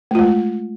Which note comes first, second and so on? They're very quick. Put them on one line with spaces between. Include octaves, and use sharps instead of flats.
A3 F4 G#3